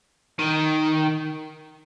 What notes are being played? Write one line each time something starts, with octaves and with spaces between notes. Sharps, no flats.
D#3